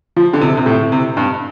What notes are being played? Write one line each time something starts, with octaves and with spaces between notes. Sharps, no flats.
F3
D3
C3
C3
A2
C3
G2